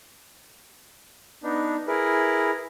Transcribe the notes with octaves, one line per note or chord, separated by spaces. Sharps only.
B3 D4 D#4
E4 G#4 A#4 B4